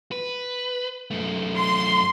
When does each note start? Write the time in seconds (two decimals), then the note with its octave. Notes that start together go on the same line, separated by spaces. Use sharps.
0.12 B4
1.11 F#2 A3
1.57 C6